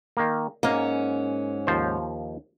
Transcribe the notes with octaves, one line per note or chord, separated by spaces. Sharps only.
D#3 A#3
G#2 A#3 C#4 F5
D#2 F3 C5